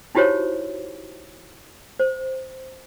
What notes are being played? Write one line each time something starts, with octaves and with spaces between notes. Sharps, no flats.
D#4 E4 F#4 G4 C5 C#5
C5